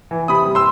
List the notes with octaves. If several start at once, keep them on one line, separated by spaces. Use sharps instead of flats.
E3
C3 B5 D#6
G3
C6 E6